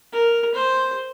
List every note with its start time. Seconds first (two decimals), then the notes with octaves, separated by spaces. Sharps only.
0.13 A#4
0.54 C5